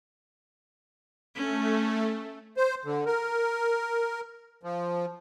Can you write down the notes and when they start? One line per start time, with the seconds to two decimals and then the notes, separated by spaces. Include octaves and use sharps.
1.35 A3 C#4
2.57 C5
2.85 D3
3.06 A#4
4.63 F3